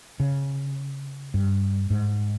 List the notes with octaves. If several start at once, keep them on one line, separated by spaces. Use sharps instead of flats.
C#3
G2
G#2